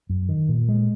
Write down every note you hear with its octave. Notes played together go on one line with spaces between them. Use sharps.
F#2
D#3
A#2
G#3